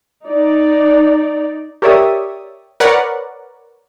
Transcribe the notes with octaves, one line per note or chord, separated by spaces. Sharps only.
D#4 D5
G4 A#4 C#5 D5 E5 D#6
A#4 B4 C#5 D5 F#5